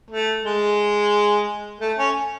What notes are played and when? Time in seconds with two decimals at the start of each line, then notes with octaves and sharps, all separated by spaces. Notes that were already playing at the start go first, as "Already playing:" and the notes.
0.10 A3
0.45 G#3
1.80 A3
1.98 C#4